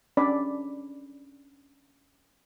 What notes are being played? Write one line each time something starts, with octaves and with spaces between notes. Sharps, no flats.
C#4 D4 D5 B5